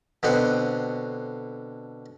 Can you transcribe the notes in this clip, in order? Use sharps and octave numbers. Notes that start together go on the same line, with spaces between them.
B2 D3 C4 F#4